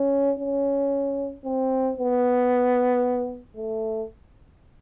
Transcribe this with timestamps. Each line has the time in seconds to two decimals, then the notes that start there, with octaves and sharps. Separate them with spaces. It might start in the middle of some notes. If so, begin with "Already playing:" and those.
Already playing: C#4
0.39 C#4
1.45 C4
1.98 B3
3.56 A3